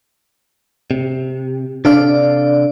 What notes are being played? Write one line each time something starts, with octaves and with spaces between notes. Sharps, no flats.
C3
C3 D4 A4 D5 F5